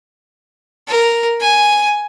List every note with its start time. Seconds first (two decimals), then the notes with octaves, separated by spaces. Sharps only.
0.87 A#4
1.41 G#5